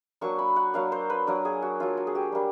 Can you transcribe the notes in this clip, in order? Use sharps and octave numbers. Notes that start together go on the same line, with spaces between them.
F#3 A#3 D4 C#6
B5
F#5
F#3 A#3 D4 F5
C5
B4
F#3 A#3 D4 A#4
G#4
F#4
F#3 A#3 D4 F4
F#4
G#4
G4
G3 A#3 D4